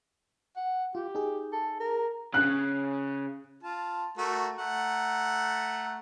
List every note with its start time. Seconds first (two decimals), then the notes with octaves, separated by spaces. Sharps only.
0.56 F#5
0.95 F4 G4
1.15 D#4 G#4
1.53 A4
1.80 A#4
2.34 C#3 F#6
3.63 F4 A5
4.17 A3 F#4 A#4
4.59 A3 F#5 A#5